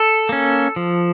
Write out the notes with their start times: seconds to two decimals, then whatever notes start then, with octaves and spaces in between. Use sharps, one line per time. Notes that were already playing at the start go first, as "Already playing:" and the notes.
Already playing: A4
0.29 A#3 C#4
0.76 F3